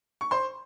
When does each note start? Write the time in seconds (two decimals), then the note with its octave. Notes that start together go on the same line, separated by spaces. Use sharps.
0.21 C#6
0.31 C5 C6